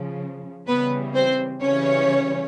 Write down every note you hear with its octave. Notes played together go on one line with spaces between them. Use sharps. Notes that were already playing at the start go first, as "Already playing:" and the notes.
Already playing: C#3 F3
C#3 E3 G3 B3 B4
C4 C5
C#3 E3 G3 C#4 C#5